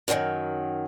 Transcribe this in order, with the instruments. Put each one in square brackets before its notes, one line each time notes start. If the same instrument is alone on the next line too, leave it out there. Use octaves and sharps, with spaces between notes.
[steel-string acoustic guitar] F#2 A#2 D3 D#3 F#3